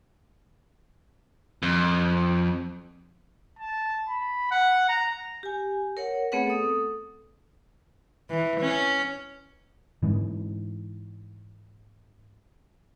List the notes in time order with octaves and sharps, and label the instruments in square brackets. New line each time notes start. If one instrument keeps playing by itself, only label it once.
[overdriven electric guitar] F2
[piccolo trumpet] A5
B5
F#5
A#5
[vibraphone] G4 G#5
A#4 C#5 F#5
A3 B3 C4 G#4 B4 F#5
A4 D#6
[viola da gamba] E3
C#4
[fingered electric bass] G#2 E3